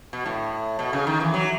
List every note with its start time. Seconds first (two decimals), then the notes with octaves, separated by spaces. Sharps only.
0.13 B2
0.26 A2
0.79 B2
0.93 C#3
1.07 D#3
1.20 E3
1.34 F#3